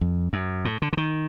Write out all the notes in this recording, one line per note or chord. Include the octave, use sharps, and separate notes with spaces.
F2
F#2
A2
D3
D3
D#3